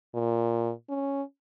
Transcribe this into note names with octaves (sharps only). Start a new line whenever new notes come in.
A#2
C#4